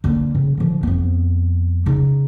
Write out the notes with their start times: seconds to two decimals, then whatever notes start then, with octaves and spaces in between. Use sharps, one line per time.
0.04 D3 A#3
0.35 C#3
0.57 D3 F3
0.83 F2 B3
1.86 C#3 D#4